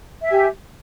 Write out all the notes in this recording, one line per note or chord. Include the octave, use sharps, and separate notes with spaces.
G4 E5 G#5